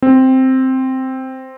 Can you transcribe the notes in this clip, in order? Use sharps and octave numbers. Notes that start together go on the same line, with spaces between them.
C4